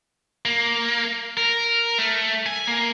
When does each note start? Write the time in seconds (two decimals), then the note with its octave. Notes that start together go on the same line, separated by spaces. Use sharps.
0.45 A#3
1.37 A#4
1.99 A3
2.46 G#5
2.68 A#3